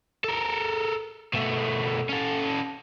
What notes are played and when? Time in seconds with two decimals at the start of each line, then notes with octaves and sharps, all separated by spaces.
0.24 A4 A#4
1.34 B2 A3
2.09 C#4 A4